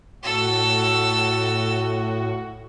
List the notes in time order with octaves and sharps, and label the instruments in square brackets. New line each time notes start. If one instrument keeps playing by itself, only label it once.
[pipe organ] A2 F#4 [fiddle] A4 E6